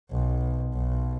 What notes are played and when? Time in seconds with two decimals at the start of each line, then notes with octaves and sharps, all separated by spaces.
0.11 B1
0.74 B1